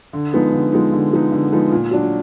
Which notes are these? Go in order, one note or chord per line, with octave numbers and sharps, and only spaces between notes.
D3
F3 G#3 B3 D#4
D3
F3 G#3 B3 D#4
D3
F3 G#3 B3 D#4
D3
F3 G#3 B3 D#4
A#2
F#3 D4 F#4